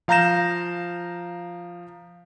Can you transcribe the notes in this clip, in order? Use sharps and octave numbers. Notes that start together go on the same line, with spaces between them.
F3 F5 A#5 G6 A#6 E7